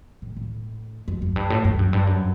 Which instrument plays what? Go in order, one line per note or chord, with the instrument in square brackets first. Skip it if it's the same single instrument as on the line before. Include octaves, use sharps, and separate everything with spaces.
[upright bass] A2
A2
F#2
F#2
G2
A2
G2
F#2
G2
F#2